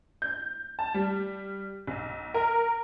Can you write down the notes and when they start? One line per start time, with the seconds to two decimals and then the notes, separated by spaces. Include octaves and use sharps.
0.22 G6
0.79 A5
0.94 G3
1.87 B1
2.34 A#4